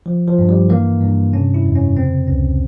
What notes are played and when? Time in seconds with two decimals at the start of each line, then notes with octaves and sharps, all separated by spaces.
0.06 F3
0.28 F3
0.39 G2
0.49 G3
0.69 E3 A#3
1.01 G2
1.33 C3 C#4
1.54 E4
1.65 F2
1.75 C#4
1.97 C#3 C4
2.28 C#2 C#4